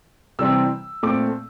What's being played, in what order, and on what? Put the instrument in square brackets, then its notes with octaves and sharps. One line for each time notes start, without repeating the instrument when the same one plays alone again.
[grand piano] C3 E3 G3 C4 E6
A#2 A3 C4 D6